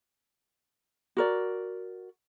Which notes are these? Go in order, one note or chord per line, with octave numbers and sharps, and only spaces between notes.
F#4 A#4 D5